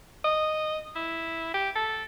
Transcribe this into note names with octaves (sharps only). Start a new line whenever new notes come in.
D#5
E4
G4
A4